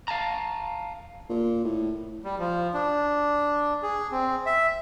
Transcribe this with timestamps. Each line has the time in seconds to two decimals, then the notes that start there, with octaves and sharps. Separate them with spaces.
0.08 F5 A5 A#5
1.29 A#2
1.64 A2
2.24 G3
2.39 F3
2.74 D4
3.83 G#4
4.11 C4
4.46 E5